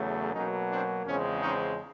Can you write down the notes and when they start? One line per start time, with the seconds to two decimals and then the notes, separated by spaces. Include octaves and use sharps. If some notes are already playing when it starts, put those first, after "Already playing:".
Already playing: E2 C#3 F#3 A3
0.34 B2 F#3 A#3 C#4 D#4
0.70 C4 D4
1.06 E2 C#3 F3 G#3 C4 C#4
1.42 C#4 D#4